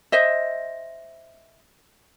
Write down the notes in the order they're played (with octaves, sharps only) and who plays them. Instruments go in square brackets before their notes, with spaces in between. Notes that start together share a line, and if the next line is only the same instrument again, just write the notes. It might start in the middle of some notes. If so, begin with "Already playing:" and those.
[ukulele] C5 D#5 E5